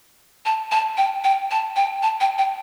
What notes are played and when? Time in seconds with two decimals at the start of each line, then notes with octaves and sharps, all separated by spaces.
0.45 A5
0.71 A5
0.97 G5
1.24 G5
1.51 A5
1.76 G5
2.02 A5
2.20 G5
2.38 G5